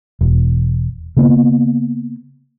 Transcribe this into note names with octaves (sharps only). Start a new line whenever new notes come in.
E1
C#3 A#3 B3